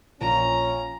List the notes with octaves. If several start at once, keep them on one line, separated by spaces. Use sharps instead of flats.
A#1 C#4 A#5